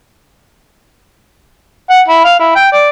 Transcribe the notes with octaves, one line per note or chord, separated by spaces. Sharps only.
F#5
E4
F5
E4
G5
D5